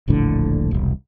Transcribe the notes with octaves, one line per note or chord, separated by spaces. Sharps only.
D#1 A#1 A2 D3
E1 C2